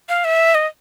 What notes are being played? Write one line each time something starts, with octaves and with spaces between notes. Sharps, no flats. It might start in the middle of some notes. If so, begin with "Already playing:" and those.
F5
E5
D#5